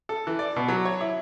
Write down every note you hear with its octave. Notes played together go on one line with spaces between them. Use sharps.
A4
E3
D5
B2
F#3
C#5
E4